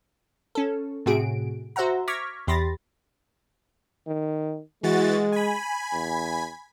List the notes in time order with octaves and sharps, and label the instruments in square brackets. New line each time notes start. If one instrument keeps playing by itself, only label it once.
[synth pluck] C#4 A4
A2 C3 F#4 G#4 D7
F#4 C5 E5 F#5 A#5
C#6 D6 F6 G#6 A#6 B6
E2 G4 B5 C6 A6 A#6
[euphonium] D#3
[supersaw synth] E3 F#4 A6 [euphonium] G#3
[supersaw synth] G#5 B5
[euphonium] E2